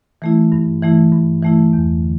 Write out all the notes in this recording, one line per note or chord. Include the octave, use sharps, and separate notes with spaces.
E3 A3 E4
G2
E3 A3 E4
G2
E3 A3 E4
E2
D3